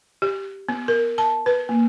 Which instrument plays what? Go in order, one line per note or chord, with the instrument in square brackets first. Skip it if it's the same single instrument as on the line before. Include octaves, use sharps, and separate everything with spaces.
[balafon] G4
B3
A#4
A5
B4
A#3